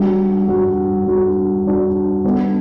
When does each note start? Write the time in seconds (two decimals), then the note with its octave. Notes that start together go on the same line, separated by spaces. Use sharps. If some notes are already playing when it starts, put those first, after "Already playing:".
Already playing: G3 D4 F#4
0.48 G3 D4 F#4
1.07 G3 D4 F#4
1.66 G3 D4 F#4
2.24 G3 B3 D4 A4